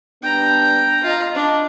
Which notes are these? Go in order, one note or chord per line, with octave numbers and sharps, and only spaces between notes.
G3 B3 D4 G5 A#5
F4 D#5 A#5
D4